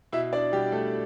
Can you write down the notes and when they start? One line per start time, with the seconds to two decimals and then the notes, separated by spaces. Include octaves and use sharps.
0.12 B2 E4 E5
0.33 D4 D5
0.52 B2 G3 G4
0.72 A3 A4